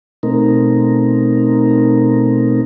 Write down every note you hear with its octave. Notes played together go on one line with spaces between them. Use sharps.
B2 A3 C4 D#4 A#4